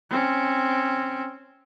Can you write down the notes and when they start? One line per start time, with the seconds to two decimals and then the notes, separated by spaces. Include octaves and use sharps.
0.10 C4 C#4